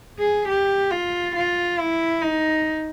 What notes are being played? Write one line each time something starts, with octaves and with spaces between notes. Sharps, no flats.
G#4
G4
F4
F4
E4
D#4